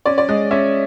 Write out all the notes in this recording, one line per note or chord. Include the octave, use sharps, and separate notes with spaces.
C#4 D5
D5
G#3 D#5
C#4 E5